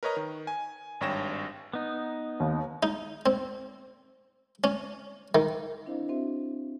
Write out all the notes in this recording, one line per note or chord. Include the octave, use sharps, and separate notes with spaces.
A#4 B4 C#5 D#5 A#5
D#3
G#5
G#1 G2 C#5 G5 A#6 E7
B3 D#4
D#2
D#4
C4
C#4
D#3
C4 D4 E4 C5 D#5 F5
C4 D4 F#4 C5 E5